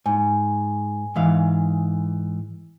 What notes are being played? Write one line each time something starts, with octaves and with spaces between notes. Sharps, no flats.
G#2 G#5
G#2 E3 F5